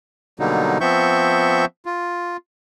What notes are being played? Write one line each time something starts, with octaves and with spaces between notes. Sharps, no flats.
B2 D3 F#3 G3 A#3 D#4
F3 B3 C4 E5 C#6 G6
F4